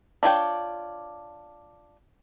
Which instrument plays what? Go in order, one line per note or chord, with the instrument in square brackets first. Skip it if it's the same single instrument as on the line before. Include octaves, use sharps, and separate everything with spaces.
[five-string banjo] D4 F4 C#5 G5